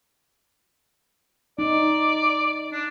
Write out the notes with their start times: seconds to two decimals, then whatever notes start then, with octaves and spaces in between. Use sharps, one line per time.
1.59 D#4 D5
2.72 D4